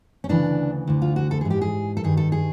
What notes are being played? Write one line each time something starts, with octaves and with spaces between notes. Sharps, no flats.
C#4
D2 C#3 E3 D4
D2 D3
F4
F#4
A4
G#4
G#2 E3
G4
G#4
A4
G2 D#3 G#4
A4
G#4